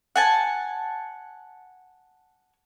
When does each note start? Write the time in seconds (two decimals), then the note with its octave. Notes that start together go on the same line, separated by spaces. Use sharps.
0.16 F#5 G#5 A5